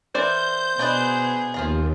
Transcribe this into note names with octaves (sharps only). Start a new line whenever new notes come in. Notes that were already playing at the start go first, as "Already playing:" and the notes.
E3 A#4 C5 D5 G6
B2 D4 G#4 B4 D#5
D#2 F3 F4 A#5